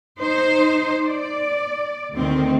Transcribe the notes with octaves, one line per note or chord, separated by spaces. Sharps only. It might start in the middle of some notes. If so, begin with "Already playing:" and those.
D#4 C5
D5
D2 D#3 C4